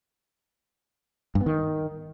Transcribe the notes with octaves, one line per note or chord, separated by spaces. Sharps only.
G2
B3
D#3